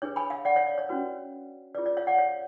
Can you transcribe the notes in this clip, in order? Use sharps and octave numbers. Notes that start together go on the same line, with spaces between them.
D4 G#4 B4 C#5
G#5 B5
F5 G#5
D5 F#5
C#5 F5
D5
C#5
C#4 F#4 B4
F4 G#4 B4 D5
D5
C#5 F5
D5 F#5
C#5 F5